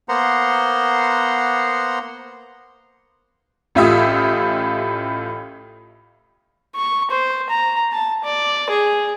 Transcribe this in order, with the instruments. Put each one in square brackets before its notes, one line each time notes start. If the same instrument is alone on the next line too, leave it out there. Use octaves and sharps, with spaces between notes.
[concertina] A#3 B3 C5 F#5 A#5 C6
[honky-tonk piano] A1 A2 F4 G4 E5 D#6
[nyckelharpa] C#6
C5
A#5
A5
D5
G#4